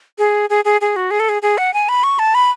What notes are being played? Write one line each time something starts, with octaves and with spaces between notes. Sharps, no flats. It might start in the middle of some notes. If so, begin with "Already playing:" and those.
G#4
G#4
G#4
G#4
F#4
G#4
A4
G#4
G#4
F#5
G#5
B5
C#6
A5
B5